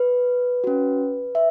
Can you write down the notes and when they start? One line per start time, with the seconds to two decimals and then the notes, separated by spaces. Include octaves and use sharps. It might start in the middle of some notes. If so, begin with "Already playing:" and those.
Already playing: B4
0.64 C#4 F#4
1.35 E5